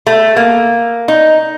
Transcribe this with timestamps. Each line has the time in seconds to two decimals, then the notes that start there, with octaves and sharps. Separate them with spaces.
0.07 A3
0.36 A#3
1.08 D#4